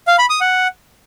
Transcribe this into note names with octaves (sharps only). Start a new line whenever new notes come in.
F5
B5
D#6
F#5